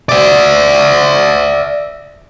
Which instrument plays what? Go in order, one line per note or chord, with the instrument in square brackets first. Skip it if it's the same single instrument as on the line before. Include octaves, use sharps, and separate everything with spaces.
[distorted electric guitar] D5 E5